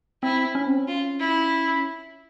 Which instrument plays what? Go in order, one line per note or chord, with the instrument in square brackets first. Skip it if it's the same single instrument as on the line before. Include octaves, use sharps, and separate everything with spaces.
[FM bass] C4 [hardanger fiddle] E4
[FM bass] C#4
C4
C#4
[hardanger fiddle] F4
E4